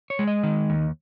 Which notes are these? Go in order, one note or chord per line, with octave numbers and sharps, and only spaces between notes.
C#5
G#3
D#5
D#3
D#2